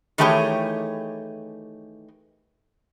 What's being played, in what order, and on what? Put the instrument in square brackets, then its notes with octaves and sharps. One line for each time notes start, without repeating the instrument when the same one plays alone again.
[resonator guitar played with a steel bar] D#3 E3 A3 G4 G#4 C#5